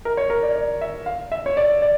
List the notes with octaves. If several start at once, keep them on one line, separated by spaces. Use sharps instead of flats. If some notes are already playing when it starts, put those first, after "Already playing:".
A#4
C#5
A#4
D5
D5
E5
F5
E5
C#5
D5
D5